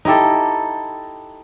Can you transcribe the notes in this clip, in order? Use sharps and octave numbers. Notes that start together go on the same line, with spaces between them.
D#4 E4 G4 A4